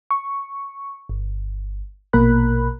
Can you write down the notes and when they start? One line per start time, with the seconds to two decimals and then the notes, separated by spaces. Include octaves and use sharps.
0.11 C#6
1.09 G1
2.13 A#1 B2 A#3 A#4 B5 F#6